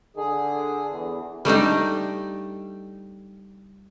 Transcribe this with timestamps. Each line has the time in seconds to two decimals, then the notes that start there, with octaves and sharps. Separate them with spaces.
0.17 D3 G#4
0.92 E2
1.45 G3 A3 D4 D#4